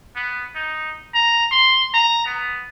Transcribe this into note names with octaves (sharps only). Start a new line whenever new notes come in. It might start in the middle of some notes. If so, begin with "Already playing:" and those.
B3
D#4
A#5
C6
A#5
B3